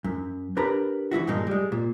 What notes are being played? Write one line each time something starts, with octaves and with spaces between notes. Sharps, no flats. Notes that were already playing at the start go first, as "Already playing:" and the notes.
F#2
D4 G4 A#4 B4 A#5 B5
E3 F#3 E4 F#4
G2 A#2 D#3 G#3 D#4
G3 G#3
A#2